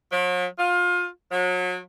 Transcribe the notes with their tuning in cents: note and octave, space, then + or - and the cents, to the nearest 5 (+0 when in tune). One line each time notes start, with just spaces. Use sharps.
F#3 -45
F4 +25
F#3 -35